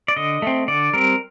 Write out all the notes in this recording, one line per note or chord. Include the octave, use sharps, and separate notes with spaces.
D5
D3 D#5
A3 C4
D3 D5
G3 C4 A#4